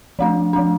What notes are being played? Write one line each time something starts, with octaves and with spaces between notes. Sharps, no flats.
F3 A3 D4
F3 A3 D4